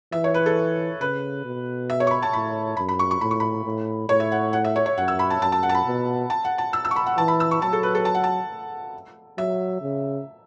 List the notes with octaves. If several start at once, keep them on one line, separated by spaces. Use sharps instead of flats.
E3 E5
C#5
B4
A4
C#3 B4
B2
E5
C#5
C#6
B5
A5
A2 B5
F#2 B5
B5
C#6
C#6
A2 B5
C#6
B5
A2
A2 C#5
E5
F#5
F#5
E5
C#5
C#5
F#2 F#5
E6
B5
A5
F#2 A5
A5
F#5
A5
B5
B2
A5
F#5
A5
E6
E6
C#6
B5
F#5
E3 A5
B5
E6
C#6
F#3 A5
A4
B4
A4
A5
F#5
A5
F#3 E5
C#3